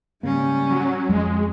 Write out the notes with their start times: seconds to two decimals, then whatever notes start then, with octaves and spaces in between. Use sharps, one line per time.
0.23 G#2 C#3 G3 A#3 C#4
0.70 F#3
1.09 F2 G#3